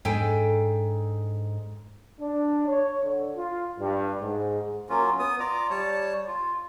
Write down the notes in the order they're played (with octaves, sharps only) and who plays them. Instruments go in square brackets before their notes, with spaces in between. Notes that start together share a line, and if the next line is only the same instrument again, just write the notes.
[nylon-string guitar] G#2 D4 A4 G5 G#5
[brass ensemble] D4
C#5
D3
F4
G2
G#2
[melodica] F#3 A#3 C#4 F4
B3 D#6
F4 D5 A#5 D6
G3 C#5 A5
F4